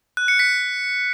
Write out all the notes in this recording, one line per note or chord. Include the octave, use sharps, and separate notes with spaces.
F#6
C#7
B6